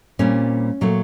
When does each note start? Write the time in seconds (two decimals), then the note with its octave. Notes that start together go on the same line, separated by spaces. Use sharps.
0.19 A#2 G3 C4 C#4
0.81 A#2 F#3 A3